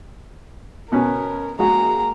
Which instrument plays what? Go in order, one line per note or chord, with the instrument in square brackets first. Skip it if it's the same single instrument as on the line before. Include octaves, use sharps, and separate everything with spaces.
[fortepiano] B2 B3 C#4 [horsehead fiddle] A#4
[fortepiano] G#3 F#4 [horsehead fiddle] A#3 A#5